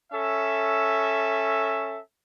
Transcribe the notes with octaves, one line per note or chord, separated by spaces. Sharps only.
C#4 A4 E5